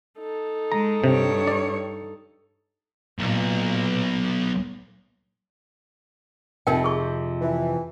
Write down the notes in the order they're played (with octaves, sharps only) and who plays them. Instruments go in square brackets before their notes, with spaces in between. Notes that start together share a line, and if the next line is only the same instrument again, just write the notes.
[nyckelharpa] D#4 A4
[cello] G#3 [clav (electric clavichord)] A#5
[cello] G2 C#5 [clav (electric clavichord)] C3
[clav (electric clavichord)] D5
[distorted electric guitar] B1 [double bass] A#2
[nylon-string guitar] F2 C3 F3 [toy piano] D#4 A#4 G5
[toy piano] G#4 C#6
[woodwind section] E3